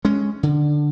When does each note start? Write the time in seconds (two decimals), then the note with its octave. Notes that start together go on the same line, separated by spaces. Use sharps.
0.05 G#3 C#4
0.43 D3